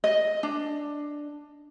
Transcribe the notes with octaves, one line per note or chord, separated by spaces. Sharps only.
D#5
D4